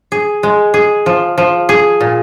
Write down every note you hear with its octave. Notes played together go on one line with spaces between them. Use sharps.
G#4
G#3
G#4
F3
F3
G#4
A#2